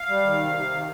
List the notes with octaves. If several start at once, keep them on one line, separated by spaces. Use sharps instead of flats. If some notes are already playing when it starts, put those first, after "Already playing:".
Already playing: F5
G3
D#3
C3
C3
D#3